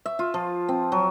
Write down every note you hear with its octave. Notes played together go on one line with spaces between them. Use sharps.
E5
F4
F3
C4
F#3